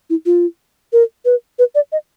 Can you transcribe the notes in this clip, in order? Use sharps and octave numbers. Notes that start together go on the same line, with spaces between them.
E4
F4
A#4
B4
B4
D5
D#5